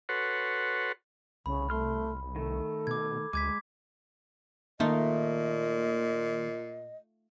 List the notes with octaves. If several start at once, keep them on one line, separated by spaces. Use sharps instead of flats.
F#4 A4 B4 C#5 F#5 C6
C2 C#3 B5
A3 C6 F6
D#3 A3 A4
B2 D6 G#6
D2 G#3 D6 G#6 B6
A#2 D#3 A3 A#3 D#4 F4 D#5